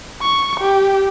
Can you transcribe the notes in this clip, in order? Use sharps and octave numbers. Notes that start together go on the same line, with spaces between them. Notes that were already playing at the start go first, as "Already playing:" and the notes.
C#6
G4